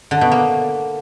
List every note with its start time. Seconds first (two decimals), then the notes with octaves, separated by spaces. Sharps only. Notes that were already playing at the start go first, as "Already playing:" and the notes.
0.11 D3
0.21 B2
0.32 A#3